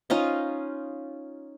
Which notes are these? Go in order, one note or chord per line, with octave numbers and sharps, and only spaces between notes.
C#4 D#4 F4 D#5